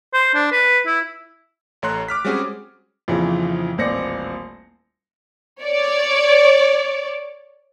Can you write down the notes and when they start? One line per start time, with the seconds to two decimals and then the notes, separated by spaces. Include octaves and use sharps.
0.14 C5
0.34 D4
0.52 B4
0.86 E4
1.82 A1 A3 C#5 A#5 C6 F#6
2.08 D6 F6 B6
2.25 G3 G#3 C4 C#4 F#4 G#4
3.08 A#1 F2 C#3 E3 F3
3.78 D#1 A1 C4 D5 A#6 C#7
5.61 C#5 D5